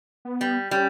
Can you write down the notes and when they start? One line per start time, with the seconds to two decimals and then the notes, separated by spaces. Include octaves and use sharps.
0.25 B3
0.41 G3
0.71 G3 C#4